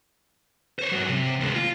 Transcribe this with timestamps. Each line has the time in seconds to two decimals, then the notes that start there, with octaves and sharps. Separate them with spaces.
0.79 C5 C#5
0.92 G#2 F#3
1.09 C3
1.40 D#2 G#3
1.55 F4